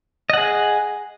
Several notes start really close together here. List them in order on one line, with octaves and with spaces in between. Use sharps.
D#5 F#5 G#4